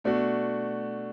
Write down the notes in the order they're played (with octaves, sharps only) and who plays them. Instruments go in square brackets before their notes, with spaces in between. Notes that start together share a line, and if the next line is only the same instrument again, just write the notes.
[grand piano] B2 A3 D4 F#4